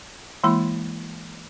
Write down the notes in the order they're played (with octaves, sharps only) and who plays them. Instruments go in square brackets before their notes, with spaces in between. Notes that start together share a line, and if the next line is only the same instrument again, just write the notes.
[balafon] E3 G#3 A#3 E4 B5